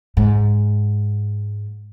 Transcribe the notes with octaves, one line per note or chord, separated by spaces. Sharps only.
G#2